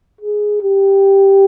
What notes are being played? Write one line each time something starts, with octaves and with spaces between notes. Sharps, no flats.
G#4
G4